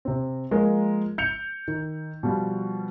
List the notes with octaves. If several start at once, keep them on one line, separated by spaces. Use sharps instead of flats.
C3 C4
F3 G#3 A#3 A#4
G6 C#7 F7
D#3
B2 F3 G3